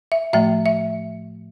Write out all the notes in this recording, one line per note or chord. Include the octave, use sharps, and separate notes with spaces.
E5
A2 F3 A3 E5
E5